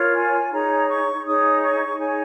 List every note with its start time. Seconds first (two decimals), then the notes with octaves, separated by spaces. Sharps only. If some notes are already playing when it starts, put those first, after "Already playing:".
Already playing: F4 A#4 C#5
0.15 G#5
0.52 D#4 G#4 C#5 A#5
0.89 C#6
1.25 D#4 G#4 C#5 D#6
1.62 C#6
1.98 D#4 G#4 C#5 G#5